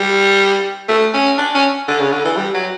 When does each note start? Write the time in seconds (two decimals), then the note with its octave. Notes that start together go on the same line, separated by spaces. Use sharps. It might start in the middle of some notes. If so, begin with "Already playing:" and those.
Already playing: G3
0.88 A3
1.13 C#4
1.38 D4
1.54 C#4
1.88 D3
2.00 C#3
2.12 D3
2.25 E3
2.37 G3
2.54 F#3